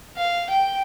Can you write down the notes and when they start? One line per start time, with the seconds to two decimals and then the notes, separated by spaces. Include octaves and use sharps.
0.16 F5
0.49 G5